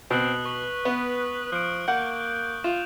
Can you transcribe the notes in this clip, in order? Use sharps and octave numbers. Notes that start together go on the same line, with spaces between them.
B2 C4 D#6 F#6 F#7
B4 C#6 F#7
B3
F3 F#6 D7
A#3 F#5 G6
F4 E7 F7